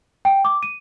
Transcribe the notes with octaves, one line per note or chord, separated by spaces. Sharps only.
G5
D6
D#7